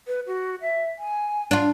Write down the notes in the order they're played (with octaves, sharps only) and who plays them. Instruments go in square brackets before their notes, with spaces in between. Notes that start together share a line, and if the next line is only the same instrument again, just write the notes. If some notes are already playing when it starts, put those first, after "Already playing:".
[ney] B4
F#4
E5
G#5
[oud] D4 F4